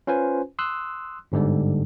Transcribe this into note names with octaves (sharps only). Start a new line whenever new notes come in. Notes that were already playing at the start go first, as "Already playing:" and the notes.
C#4 F4 B4 C5 G#5
C6 D#6 E6 F#6
G1 G#2 D3 G3